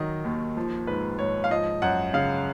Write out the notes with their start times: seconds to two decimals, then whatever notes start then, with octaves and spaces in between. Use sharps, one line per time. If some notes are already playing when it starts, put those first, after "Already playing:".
Already playing: D#3 F#3 D#5
0.24 D#2
0.57 F3
0.87 G#2 B4
1.19 G#2 C#5
1.44 F5
1.51 F3 D#5
1.82 F#2 F#5
2.14 C#3 F5